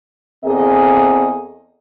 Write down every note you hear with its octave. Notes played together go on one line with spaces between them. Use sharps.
E2 A#3 C4 G#4 A4 D#5